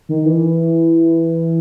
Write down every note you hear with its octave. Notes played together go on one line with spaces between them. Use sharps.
D#3
E3